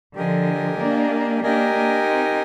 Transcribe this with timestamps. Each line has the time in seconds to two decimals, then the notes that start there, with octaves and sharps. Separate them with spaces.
0.16 D3 F3 G4 A#4 D#5 G#5
0.79 A#3 D4
1.43 A#3 D4 G4 A#4 D#5 G#5
1.74 A#3 D4
2.06 C4 D#4